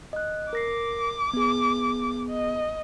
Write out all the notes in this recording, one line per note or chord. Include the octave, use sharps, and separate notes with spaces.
D#5 F#6
A#4 D6 A#6 C7
B3 G#4
D#5